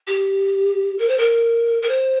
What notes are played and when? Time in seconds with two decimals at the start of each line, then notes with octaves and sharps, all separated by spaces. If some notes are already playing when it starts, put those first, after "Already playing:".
0.07 G4
0.98 A#4
1.09 C5
1.18 A#4
1.82 A#4
1.89 C5